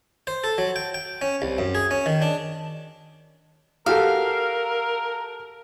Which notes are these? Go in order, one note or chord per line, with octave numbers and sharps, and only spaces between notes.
C5
A4
F#3
G5
G5
C#4
C2
F#2
G#4
C#4
D#3
D4
F#4 G4 A4 A#4 F5